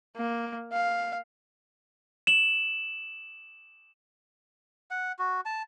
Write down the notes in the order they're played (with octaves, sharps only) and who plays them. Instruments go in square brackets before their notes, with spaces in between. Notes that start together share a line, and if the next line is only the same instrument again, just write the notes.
[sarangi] A#3
F5
[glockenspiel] E7 F#7
[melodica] F#5
F#4
A5